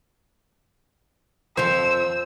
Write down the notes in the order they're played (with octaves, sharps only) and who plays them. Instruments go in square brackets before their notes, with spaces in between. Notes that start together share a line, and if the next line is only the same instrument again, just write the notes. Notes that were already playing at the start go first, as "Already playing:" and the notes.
[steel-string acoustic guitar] F2 F3 [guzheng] C5 [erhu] E6